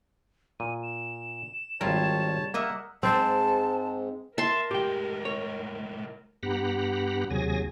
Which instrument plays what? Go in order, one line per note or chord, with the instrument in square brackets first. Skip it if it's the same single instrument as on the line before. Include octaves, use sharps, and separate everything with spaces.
[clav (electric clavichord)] A#2 [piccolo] D#7
[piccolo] E7
[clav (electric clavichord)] G#1 F4 A#4 [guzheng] G3 [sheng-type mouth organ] C#5 A5
[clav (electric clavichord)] A#3 [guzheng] A#4 D#5 E5 [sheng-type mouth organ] F#5
[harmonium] G#2 G#3 [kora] C4 C5 [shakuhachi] A5
[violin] A#4 [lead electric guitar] E5 [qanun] A5 C6
[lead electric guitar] A2 G#3 [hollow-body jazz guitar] G4 G5
[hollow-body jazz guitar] C#5
[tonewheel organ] G2 B3 G4 F#5 A#5 B5
D#2 C3 F#3 G#4 G#5 A#6